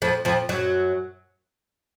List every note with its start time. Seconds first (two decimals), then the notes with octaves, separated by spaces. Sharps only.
0.02 F2 F3
0.25 F2 F3
0.49 F#2 F#3